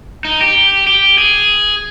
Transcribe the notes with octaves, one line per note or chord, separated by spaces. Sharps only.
D#4
G4
G4
G#4